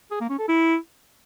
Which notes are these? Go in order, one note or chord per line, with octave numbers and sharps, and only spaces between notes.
G#4
A#3
C#4
A4
E4